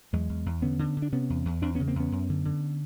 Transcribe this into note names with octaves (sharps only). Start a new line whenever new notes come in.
E2 F#3 G#3
E2
E2
D3 B3 C#4
D3
D3
D4
C3 B3 C#4
E2
E2
E2 C4 D4
B3 C#4
C#3
A#3 C4
E2 B3 C#4
F#2
D3
D3